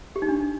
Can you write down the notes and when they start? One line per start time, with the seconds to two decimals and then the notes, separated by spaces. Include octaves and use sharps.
0.16 G4
0.22 D#4
0.28 D4